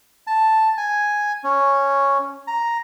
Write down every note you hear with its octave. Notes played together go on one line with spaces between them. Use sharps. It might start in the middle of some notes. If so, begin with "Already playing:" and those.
A5
G#5
C#4
A#5